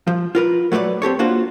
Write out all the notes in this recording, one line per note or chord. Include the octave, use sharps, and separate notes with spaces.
F3
F4 A#4 B4
F#3 A3 B4 C5 D5
C4 G4 A4 C#5
A#3 D4 F4 F#4 C5